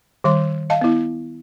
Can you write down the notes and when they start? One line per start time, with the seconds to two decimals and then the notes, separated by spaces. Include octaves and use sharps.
0.24 D#3 G3 C6
0.70 D#5 F5 A5
0.81 B3 E4